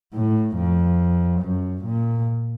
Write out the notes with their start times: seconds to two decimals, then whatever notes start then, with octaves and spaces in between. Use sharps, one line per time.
0.14 A2
0.57 F2
1.42 F#2
1.85 A#2